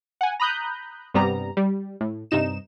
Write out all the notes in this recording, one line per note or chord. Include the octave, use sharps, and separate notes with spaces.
F#5 G#5
A#5 B5 D#6 F#6 G6
G2 C3 G3 B3 A#5
G3
A2
G2 C3 D#4 E7